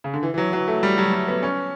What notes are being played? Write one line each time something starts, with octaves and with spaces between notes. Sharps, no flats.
C#3
D3
E3
E3
F#3
F#3
A3
G3
F#3
G3
B3
C#4